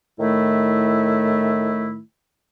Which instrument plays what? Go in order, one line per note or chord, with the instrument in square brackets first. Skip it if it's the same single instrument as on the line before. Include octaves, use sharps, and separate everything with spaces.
[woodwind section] A2 D#3 A3 E4